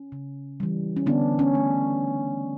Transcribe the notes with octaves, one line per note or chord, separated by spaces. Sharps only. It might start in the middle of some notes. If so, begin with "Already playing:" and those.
Already playing: C#4
C#3
E3 G3
C#4
D3 B3 D4
C#4
A3